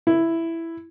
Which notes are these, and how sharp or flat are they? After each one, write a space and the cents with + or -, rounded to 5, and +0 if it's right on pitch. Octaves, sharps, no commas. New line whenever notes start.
E4 +5